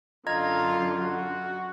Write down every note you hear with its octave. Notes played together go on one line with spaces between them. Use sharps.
F#2 D3 F4 D#5 A#5 G#6
F#4